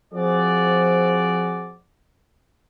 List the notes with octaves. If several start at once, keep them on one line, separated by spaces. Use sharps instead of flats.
F3 C4 F#4 G#4 D5